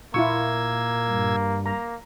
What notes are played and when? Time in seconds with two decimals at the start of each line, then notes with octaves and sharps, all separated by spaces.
0.14 A#2 A#3 E4 F4 C#6 E6 G#6
1.09 G2
1.66 A#3 A#5